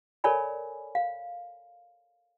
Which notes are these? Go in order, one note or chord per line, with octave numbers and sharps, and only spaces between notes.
A4 A#4 C#5 D5 G#5 B5
F5